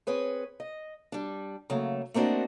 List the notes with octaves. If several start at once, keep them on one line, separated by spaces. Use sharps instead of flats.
C4 G#4 B4 C#5
D#5
G3 D4
C#3 F#3 A3 A#3
A3 A#3 C4 D4 F#4 D#5